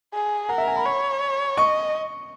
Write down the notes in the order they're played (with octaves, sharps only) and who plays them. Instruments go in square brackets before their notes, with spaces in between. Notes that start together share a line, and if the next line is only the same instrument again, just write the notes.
[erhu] G#4
[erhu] A#4 [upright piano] F#5
[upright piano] E5
G#5
B5
[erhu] C#5
[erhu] D#5 [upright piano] C#6